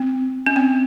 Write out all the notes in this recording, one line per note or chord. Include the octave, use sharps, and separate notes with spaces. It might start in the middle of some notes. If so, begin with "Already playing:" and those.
Already playing: C4
C#4
C4